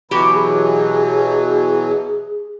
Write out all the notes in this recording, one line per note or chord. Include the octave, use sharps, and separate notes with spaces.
B2 E3 F#3 F#4 G4 B5
G#4